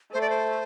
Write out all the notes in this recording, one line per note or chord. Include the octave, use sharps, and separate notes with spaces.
A3 C5
D5
C5